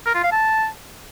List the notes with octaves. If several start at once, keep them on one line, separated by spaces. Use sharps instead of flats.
A#4
F4
F5
A5